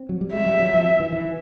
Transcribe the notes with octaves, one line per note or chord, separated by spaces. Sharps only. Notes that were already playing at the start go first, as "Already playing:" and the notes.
Already playing: C4
F#3
G3
G#3 E5
G3
F#3
F3
E3
E3